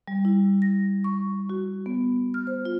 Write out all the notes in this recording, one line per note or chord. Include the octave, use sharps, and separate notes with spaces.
G3
E4
A#6
C#6
F#4
B3
F6
C5
F4